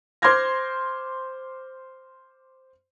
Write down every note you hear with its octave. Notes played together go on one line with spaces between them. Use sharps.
C5 C6 D6 F6 G#6 A#6